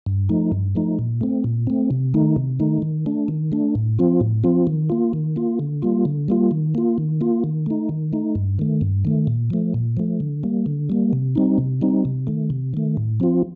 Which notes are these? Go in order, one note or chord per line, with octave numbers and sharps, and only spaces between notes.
G2
F3 A3 D#4
G2
F3 A3 D#4
A#2
A3 C4
A#2
A3 C4
C3
D#3 A3 D#4
C3
D#3 A3 D#4
D#3
A3 D4
D#3
A3 D4
A2
F3 C4 F4
A2
F3 C4 F4
D#3
A#3 F4
D#3
A#3 F4
D3
G3 A#3 F4
D3
G3 A#3 F4
D#3
A#3 F4
D#3
A#3 F4
D#3
A3 D#4
D#3
A3 D#4
G2
D#3 A3
G2
D#3 A3
A#2
F3 A3
A#2
F3 A3
D3
G3 A#3
D3
G3 A#3
C3
G3 C4 D#4
C3
G3 C4 D#4
C3
D#3 A3
C3
D#3 A3
A2
F3 C4 F4